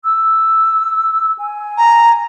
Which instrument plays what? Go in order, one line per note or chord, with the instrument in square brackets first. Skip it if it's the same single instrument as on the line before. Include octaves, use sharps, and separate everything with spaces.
[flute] E6
G#5
[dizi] A#5